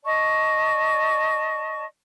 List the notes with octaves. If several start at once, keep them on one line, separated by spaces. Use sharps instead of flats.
D5 D#5 A5 C#6